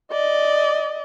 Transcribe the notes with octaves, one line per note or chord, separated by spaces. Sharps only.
D5 D#5